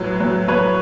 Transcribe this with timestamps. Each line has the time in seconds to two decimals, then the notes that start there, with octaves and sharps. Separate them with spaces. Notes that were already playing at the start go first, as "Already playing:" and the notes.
Already playing: A2 F#3 B4
0.20 F#3
0.48 F#3 B4 C#5